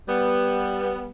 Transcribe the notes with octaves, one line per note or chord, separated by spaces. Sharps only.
G3 B3